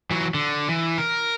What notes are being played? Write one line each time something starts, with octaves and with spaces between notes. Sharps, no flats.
E3 F#3
D3
E3
A#4